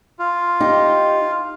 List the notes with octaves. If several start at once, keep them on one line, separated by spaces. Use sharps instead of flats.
F4
D#4 G4